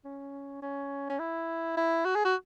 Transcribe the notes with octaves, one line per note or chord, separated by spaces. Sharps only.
C#4
C#4
C#4
E4
E4
F#4
G#4
F#4